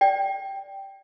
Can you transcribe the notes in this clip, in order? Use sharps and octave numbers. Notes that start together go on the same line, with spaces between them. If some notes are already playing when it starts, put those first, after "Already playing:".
D5 G5